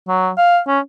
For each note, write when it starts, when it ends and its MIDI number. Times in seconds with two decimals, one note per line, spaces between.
0.08 0.30 54
0.38 0.60 77
0.68 0.80 61